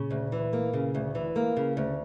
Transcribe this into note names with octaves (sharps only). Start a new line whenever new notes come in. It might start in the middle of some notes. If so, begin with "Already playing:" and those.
Already playing: A#2 C#3
D2
E3
A#3
C#3
D2
E3
A#3
C#3
D2